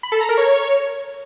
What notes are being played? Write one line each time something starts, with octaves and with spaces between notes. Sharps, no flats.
B5
A4
A#5
A#4
C#5